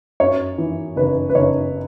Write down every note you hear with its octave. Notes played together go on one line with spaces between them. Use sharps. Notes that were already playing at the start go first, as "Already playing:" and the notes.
F#2 C#5
E3
F#1 B4
B4
F#1 C#5